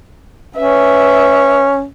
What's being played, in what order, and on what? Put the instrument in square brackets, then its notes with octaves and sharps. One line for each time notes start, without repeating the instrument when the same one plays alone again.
[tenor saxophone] C#4 [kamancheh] B4 E5